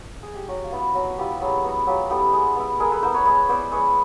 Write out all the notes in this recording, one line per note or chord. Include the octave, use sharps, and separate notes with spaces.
G#4
G4
F#3 F#4
F4
B3 E4
F#4
F#3 F#4
B3 E4 F4 G4
F#3 F#4 G#4
B3 E4 F#4
F#3 F4 G4
B3 E4 G4 A4
G#3
B3 E4
G#3 G#4 A#4
A4 B4
B3 E4 A#4 C5
B4 C#5
G#3 B4 C#5
B3 E4 C5 D5
G#3 B4 C#5